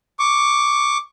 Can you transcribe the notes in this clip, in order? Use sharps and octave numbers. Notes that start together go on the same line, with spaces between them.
C#6 D6